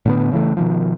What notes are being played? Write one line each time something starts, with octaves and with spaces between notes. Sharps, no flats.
A2 D3 B3
C#3 E3 A3
B2 D#3 F3